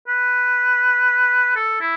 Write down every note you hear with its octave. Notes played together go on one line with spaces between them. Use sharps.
B4
A4
E4